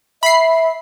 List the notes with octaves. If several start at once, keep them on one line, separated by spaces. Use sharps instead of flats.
E5 B5 C7